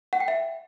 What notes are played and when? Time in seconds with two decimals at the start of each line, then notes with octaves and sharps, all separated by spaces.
0.13 F#5
0.20 G5
0.28 E5